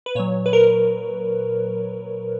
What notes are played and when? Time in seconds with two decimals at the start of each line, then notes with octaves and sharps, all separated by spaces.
0.06 B4
0.15 A#2 F#3 C#5
0.46 B4
0.53 A#4